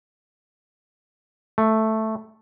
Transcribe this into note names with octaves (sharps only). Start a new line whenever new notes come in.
A3